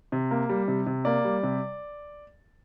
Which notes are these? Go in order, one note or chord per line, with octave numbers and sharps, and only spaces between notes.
C3
A#3
G3
C3
C3
A#3 D5
G3
C3